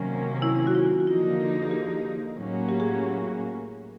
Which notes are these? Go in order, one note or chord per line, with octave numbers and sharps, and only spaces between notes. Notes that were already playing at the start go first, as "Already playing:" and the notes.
Already playing: C3 D#3 F#3 A#3 C#4
E4
F#4
F4
F#4
D3 F3 A#3 D#4 F4
G#4
G4
A2 F#3 A#3 C#4 F#4
G4
G#4